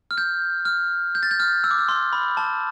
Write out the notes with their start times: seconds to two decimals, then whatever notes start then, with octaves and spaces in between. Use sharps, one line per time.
0.11 F6
0.18 G6
0.65 F6
1.15 G6
1.23 A6
1.31 G6
1.40 F6
1.64 E6
1.71 D6
1.79 E6
1.89 C6
2.13 B5
2.37 A5